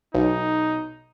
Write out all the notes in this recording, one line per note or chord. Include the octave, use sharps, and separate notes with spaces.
B1 D#4